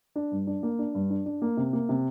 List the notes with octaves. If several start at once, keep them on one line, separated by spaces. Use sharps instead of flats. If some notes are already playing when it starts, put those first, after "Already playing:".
D4
G2
D4
A#3
D4
G2
D4
D4
A#3
C3
A#3
C3